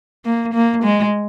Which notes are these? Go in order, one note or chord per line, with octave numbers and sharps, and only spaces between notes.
A#3
A#3
G#3